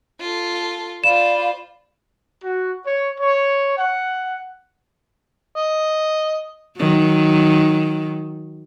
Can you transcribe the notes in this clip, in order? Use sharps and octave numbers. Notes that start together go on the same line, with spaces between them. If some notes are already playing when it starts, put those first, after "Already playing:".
F4 A4
F4 C5 D5 F5 B5 E7
F#4
C#5
C#5
F#5
D#5
D#3 F#3